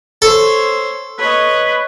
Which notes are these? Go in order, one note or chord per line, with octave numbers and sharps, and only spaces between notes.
A4 C5 C#5
B4 C#5 D#5